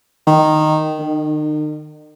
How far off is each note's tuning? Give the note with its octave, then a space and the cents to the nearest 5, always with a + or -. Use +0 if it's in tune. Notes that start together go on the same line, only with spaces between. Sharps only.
D#3 -5
D#3 -40